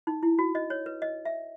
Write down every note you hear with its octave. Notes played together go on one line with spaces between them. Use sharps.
D#4
E4
F#4
D#5
C#5
B4
D#5
E5